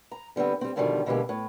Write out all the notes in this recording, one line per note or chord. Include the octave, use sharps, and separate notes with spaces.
A#5
D3 G3 B3 C4
G3 C4
F#2 B2 D3 D#3 F3 G3
B2 D3 E3 G#3 A#3 G4
A2